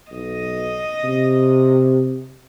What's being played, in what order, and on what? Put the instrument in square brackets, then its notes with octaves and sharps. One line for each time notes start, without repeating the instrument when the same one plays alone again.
[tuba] B1 [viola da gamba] D#5
[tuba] C3